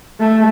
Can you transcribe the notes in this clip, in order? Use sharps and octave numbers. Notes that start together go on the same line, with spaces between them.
A3